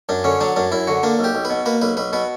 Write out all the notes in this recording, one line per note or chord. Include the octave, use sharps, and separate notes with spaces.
F#2 D4
D3 C#4
F#3 D4
F#2 D4
F#2 E4
D3 F#4
A#3 D4
B1
G4
B1
B4
B2
A#3 B4
B1 B4
B1 B4
B2 B4